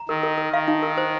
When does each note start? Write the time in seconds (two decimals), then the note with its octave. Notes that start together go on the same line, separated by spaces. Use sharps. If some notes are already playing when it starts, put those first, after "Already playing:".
Already playing: A#5
0.09 D#3 A#4
0.23 A#4
0.38 A#4
0.53 D#3 F5
0.68 D#4
0.82 A#4
0.98 C5